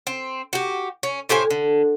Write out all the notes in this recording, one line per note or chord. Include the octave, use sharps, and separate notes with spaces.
C4
F#4 G4
C#4
A2 G4 C5 G#5
D3